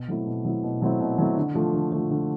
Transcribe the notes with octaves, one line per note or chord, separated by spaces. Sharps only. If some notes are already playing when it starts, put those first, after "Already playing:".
Already playing: B2
F#3 A3 C4 E4
B2
F#3 A3 C4 E4
B2
F#3 A3 C4 E4
B2
F#3 A3 C4 E4
D3
F3 A3
D3
F3 A3
D3